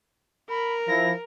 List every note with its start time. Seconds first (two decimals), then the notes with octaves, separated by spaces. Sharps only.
0.49 A#4 B5
0.88 F3 E4 A#6